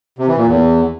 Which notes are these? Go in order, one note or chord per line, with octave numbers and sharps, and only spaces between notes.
C3
E3
A#2
E2